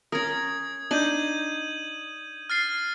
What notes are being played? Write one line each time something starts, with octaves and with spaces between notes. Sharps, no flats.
C#4 A#4 D#6 G#6
D4 D#4 G6 D#7 F#7
F6 A6 C7